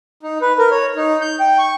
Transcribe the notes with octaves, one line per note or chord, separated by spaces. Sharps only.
D#4
B4
A#4
C#5
D#4
G6
G5
C#6